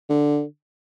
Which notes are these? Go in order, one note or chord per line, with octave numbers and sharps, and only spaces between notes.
D3